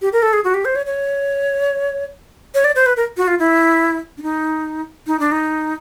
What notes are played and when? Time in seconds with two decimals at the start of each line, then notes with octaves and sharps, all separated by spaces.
0.02 G4
0.13 A#4
0.22 A4
0.33 G#4
0.44 F#4
0.54 G4
0.65 C5
0.75 C#5
0.86 C#5
2.54 C#5
2.64 D5
2.76 C5
2.86 B4
2.97 A#4
3.17 F#4
3.27 F4
3.39 E4
4.17 D4
4.22 D#4
5.07 D#4
5.20 D4
5.32 D#4